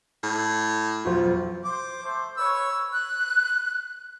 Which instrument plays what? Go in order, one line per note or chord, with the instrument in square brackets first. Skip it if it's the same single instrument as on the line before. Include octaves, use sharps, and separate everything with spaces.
[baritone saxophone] A2
[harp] B1 F2 [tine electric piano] F4 F#4 C5
[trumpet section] C5 [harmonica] D6
[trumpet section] A3 C5
[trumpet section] B4 C#5 [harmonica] E6
[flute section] F#6